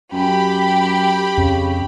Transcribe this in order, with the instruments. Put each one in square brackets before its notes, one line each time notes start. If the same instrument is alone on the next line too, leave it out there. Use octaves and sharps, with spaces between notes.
[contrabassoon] F#2 [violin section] G4 B5
[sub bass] F2 [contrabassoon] C#3